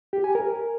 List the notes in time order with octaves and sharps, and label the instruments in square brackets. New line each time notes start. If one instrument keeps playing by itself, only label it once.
[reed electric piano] G4
G#5
A#4